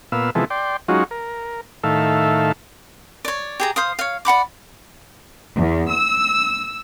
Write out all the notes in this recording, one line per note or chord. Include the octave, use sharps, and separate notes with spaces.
A#2 B3 F5 E6
C3 E3 F3 G#3 B3 A4
D5 G5 C6
F#3 G#3 C#4 D#4 F4 F#4
A#4
A2 D#3 A4 E5 F5
C#5 D5
G4 G#4 A#5
C5 F5 D#6
C#5 F5
D5 F#5 B5 D6
E2
E6